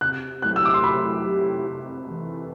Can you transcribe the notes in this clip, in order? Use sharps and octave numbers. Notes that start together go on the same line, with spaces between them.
C3 F#6
F#3 A3 E4 G4 F#6
E6
D6
C6
C3 B5
F#3 A3 E4 G4
C3
E3 A3